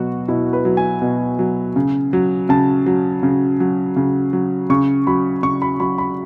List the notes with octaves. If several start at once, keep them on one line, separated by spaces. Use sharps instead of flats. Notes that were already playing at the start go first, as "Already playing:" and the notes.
Already playing: B2 F#3 F#4
B2 E4
B4
F#3
G#5
B2
F#3
C#3
F#3
C#3 A5
F#3
C#3
F#3
C#3
F#3
C#3 C#6
F#3 B5
C#3 C#6
B5
F#3 B5
B5